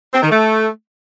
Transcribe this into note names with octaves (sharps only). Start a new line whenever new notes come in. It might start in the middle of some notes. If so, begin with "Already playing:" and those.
C4
D#3
A3